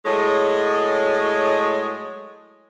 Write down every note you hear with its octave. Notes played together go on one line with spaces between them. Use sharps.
A2 F#3 G#3